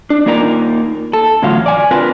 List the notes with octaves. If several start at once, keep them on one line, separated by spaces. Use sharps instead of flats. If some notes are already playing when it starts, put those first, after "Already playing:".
D4
A#3 D#4 F4 A#4 A#5
A4
E2 A2 D3 F#3 F4 F5
D5 G#5
C4 D4 F4 A#4 B4